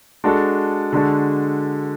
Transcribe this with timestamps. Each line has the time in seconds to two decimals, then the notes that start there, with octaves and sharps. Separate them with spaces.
0.24 G#3 D4 F#4 A4
0.93 D3 G#3 D4 F#4 A4